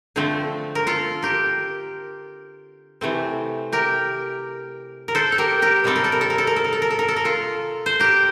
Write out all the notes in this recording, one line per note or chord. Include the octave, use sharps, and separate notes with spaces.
D3 F3 A3 C4
A#4
F4 A4
G4 A#4
C3 E3 A3 C4
G4 A#4
A#4
A4 C5
A4
G4 A#4
G4 A#4
C3 G3 C4 A4
A#4
A4
A#4
A4
A#4
A4
A#4
A4
A#4
A4
A#4
A4
A#4
A4
A#4
F4 A4
C5
G4 A#4